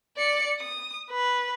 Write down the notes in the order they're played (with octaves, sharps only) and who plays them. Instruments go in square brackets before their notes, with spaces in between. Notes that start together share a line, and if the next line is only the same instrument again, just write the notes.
[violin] D5 C#7
D#6
B4